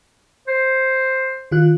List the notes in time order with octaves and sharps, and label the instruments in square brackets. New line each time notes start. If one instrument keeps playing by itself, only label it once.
[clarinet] C5
[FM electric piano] D#3 F4 F#6